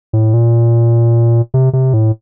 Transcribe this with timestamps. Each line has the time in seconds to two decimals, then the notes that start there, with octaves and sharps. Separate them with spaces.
0.13 A2
0.34 A#2
1.54 C3
1.73 C3
1.94 A2